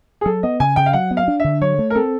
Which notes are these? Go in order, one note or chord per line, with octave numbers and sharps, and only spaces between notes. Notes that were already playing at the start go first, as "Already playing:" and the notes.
G#4
F#3 A4
B3 D#5
C#3 G#5
C#3 G5
F5
F#3 F#5
B3
F5
D4
D3 E5
F#3 C#5
A3
A#4
C4 A4